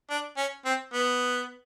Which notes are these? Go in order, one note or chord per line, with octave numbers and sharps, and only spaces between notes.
D4
C#4
C4
B3